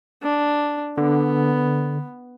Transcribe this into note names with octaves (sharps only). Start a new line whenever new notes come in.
D4
D3 B3